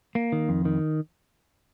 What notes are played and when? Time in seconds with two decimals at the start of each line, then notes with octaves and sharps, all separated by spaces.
0.15 A#3
0.32 D#3
0.49 F2
0.65 D#3